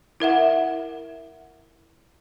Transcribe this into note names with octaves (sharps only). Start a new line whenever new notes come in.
E4 A#4 E5 F#5